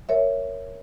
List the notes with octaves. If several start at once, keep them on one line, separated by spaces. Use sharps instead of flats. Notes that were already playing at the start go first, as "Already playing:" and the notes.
A#4 C#5 E5